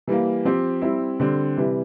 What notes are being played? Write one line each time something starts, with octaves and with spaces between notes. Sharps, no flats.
E3 G3 A#3
F3 C4 G4
G3 C4 E4
D3 G3 C4
C3 E3 G3